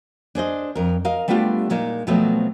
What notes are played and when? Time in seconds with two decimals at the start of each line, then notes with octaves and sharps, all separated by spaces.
0.35 D4 G#4 C5 D#5
0.75 F2 A#4
1.05 A#4 D#5 F5
1.28 G3 A3 B3 D4 F4 G4
1.70 A#2 G#3 A#3 D#4
2.07 B2 F3 F#3 A3 B3 C4